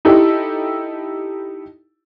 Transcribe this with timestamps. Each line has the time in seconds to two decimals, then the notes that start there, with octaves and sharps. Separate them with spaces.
0.05 D#4 E4 G4 A4